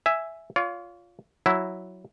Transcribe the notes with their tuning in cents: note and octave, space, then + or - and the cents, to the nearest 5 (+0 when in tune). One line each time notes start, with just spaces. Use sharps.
E5 +0 G#5 +0
F4 +5 C#5 +45
F#3 +0 E4 +0